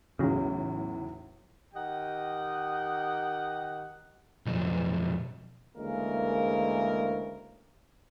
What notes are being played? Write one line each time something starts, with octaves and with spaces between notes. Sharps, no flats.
B1 E2 A2 C#3 F#3
D#3 G4 D#5 F#5 G5
B1 F2
D2 C#3 E3 G#3 A#3 A#4